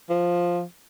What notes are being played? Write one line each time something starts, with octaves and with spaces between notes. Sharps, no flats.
F3